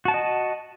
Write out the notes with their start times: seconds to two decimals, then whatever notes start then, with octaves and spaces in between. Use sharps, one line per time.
0.05 F#4
0.08 A5
0.11 F#5
0.14 D#5